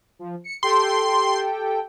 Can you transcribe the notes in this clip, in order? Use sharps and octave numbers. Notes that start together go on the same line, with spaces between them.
F3
C#7
G4 A4 G5 C6